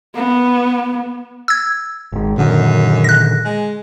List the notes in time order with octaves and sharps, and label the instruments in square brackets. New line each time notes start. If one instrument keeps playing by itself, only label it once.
[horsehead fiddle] B3
[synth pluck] E6 G#6
[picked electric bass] G#1 G#2
[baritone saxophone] F#2 [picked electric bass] A#2 D3 D#3
[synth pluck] F#6 A#6
[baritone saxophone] G#3